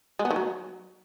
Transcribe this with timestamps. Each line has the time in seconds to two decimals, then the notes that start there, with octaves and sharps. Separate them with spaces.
0.19 G#3
0.25 B3
0.31 D#3
0.36 F#3